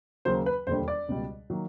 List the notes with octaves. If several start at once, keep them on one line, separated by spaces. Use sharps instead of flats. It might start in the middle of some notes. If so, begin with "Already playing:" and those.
D#2 C#3 F#3 A#3 C5
B4
E1 D#2 D3 G3 C5
D5
C#2 B2 G3
D#3 F#3 A#3